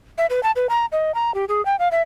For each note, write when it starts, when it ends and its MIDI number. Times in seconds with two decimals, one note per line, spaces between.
0.18 0.26 76
0.30 0.43 71
0.43 0.51 81
0.56 0.67 71
0.69 0.86 82
0.92 1.14 75
1.14 1.34 82
1.35 1.45 67
1.49 1.64 68
1.66 1.76 79
1.79 1.88 77
1.91 2.02 76